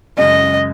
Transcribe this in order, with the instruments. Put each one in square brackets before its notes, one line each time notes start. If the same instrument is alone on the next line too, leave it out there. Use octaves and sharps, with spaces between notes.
[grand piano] F#2 C#3 G#3 [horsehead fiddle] D#5